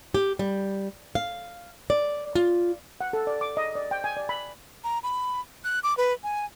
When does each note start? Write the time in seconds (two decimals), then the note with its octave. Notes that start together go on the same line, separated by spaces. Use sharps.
0.14 G4
0.39 G3
1.15 F5
1.90 D5
2.35 F4
3.01 F#5
3.13 A4
3.27 D5
3.41 D6
3.57 D#5
3.75 D5
3.91 G5
4.04 G#5
4.17 D5
4.29 B5
4.84 A#5
5.03 B5
5.64 F#6
5.83 D6
5.97 B4
6.23 G#5